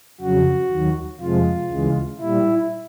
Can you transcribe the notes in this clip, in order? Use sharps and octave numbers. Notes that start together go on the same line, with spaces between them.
F2 C#3 F#3 F#4
D#2 D#3 F#3
F2 C3 F3 G#3 F4
D2 C#3 E3 G#3
A#2 G3 E4